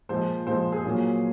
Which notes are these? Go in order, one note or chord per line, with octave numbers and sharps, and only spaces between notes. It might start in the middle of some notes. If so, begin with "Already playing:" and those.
A#2 F3 G#3 C5
A#2 F3 G#3 C5
G#4
A#2 F#3 A#3